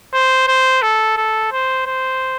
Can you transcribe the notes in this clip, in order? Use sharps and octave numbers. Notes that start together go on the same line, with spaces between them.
C5
C5
A4
A4
C5
C5